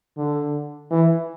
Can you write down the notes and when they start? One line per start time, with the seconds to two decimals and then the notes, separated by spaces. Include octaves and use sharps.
0.17 D3
0.91 E3